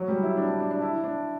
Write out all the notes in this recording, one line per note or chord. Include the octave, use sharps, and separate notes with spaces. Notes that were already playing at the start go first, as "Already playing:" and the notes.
Already playing: F#3
G3
E4
D4
D4
D4
D4
E4
D4